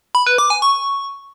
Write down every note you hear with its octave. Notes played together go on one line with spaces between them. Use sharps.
B5
B4
D6
G#5
C#6